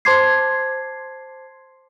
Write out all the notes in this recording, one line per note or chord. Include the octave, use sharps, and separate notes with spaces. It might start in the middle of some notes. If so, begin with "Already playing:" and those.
C5 A5 C6 D6 G#6 C7